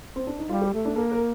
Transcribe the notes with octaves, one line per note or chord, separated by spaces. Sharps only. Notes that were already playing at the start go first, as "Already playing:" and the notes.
C4
D4
D#4
G3 F4
G4
A3
D4
A#3 A4
A#4